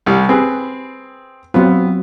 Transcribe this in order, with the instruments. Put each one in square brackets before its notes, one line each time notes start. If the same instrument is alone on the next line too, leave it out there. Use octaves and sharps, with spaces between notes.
[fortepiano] C2 G3
[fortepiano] C4 G#4 [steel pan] B4
[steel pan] F#3 C4 F4 [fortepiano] B3